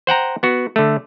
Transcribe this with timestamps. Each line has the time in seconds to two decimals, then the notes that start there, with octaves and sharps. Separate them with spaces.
0.07 C5 F#5 G5 A#5
0.43 B3 F#4
0.76 D3 A3